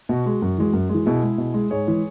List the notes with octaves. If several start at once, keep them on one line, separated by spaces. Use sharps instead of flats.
B2 F#4
G#3
F#2 F#4
E3 G#3
F#2
E3 G#3
B2 E4 G#4
G#3
B2
G#3
G#2 G#4 C#5
E3 G#3